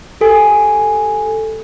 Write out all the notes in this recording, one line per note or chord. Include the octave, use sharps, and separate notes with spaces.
G4 A4 G#5